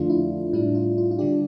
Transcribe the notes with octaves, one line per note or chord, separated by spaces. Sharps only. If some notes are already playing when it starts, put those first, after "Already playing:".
Already playing: F2 D3 F3 A3 D4 F4
E4
A2 G3 D4 E4
F4
F4
F4
D3 G3 D4 G4